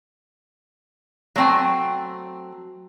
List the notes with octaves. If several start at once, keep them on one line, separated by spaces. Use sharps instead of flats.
F#3 A3 C4 G5 G#5